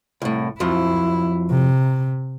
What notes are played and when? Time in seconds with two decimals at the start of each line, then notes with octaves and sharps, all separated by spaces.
0.22 C2 A2
0.60 F2 F3 F#3 E4
1.50 C3